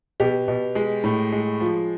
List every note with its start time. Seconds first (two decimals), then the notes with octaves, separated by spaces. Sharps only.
0.20 B2 G4
0.48 B2
0.75 G#3
1.04 A2
1.32 G#3
1.61 F3